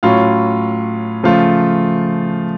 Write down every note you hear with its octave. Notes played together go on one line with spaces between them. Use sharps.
A2 F#3 C#4 F4
C#3 F3 A3 F4